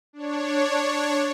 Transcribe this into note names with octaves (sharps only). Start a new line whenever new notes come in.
D4 C#5